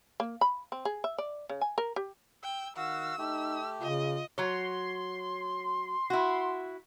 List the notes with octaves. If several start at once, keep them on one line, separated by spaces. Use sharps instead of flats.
A#3
B5
C4
G#4
E5
D5
C#3
G#5
A#4
G4
G5 E6
D#3 F#4 F5 F#5 E6
A3 D#4 G4
C#3 F4 D#5
F#3 C#5 C6
E4 F#4